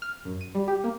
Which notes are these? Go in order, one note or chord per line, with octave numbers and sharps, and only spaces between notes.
F6
F#2
D#7
G3
G4
A#3